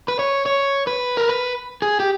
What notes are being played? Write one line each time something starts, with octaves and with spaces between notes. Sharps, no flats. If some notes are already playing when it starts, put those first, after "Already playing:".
B4
C#5
C#5
B4
A#4
B4
G#4
G4